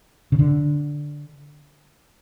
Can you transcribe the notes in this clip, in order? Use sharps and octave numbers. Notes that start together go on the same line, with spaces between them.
C#3
D3